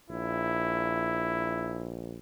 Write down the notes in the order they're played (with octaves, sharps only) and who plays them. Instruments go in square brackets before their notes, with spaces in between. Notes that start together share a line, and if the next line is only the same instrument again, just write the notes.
[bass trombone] A#1 [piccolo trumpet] E4